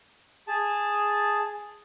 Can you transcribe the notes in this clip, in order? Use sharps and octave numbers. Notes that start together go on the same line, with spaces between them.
G#4 A5